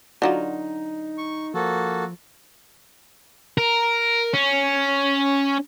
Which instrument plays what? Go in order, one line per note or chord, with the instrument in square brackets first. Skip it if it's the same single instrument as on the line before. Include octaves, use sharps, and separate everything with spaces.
[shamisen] D3 F#3 F4 [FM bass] D#4
[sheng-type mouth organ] C#6
[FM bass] F3 [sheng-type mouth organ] A#3 F#4 A4
[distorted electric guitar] A#4
C#4